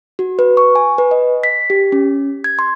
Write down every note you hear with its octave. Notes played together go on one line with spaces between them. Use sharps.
F#4
B4
C#6
G#5
B4
D#5
B6
G4
C#4
G#6
C6